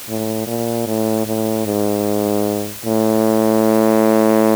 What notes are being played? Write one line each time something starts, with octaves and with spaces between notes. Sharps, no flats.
A2
A#2
A2
A2
G#2
A2